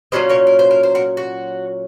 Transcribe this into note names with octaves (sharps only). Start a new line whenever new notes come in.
A#2 F#3 C#4 F4 C5 D#5
A#4 C#5
A#4
C5
A#4
C5
F#4 A#4
F#4